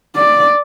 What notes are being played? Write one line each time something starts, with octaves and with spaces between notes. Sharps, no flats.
D5